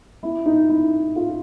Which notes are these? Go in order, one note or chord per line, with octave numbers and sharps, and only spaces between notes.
E4
D#4
E4
F4